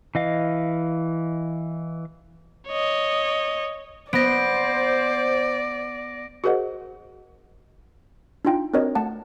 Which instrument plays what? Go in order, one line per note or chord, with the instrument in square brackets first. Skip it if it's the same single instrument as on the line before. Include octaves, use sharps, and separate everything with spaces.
[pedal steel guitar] E3 D#5 F5
[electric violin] C#5 D#5
[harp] B3 [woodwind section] C5 [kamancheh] D5 [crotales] A#6 D7
[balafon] F#4 G#4 A#4 C5 D#5 F#5
[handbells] D4 D#4 F4 G5
C4 D4 F#4 A#4 C#5 D#5
A3 F#5 A5